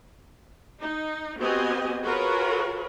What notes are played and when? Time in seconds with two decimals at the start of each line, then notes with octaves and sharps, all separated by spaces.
0.80 D#4
1.39 B3 C4 F#4 G4 D#5 G#5
2.04 F4 F#4 G#4 A#4 B4 C#5